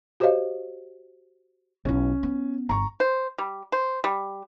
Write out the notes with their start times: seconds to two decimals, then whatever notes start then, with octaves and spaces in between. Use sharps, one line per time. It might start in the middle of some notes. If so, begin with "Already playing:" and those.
0.20 F#4 G4 C5 C#5 D#5 F5
1.85 B1 C#4 E4
2.23 B3
2.69 G1 A#5 C#6
3.00 C5
3.38 G3
3.72 C5
4.04 G3